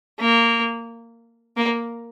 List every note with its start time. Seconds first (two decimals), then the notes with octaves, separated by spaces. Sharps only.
0.20 A#3
1.57 A#3